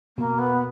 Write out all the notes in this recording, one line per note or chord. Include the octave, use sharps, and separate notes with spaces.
B2 A#3
B3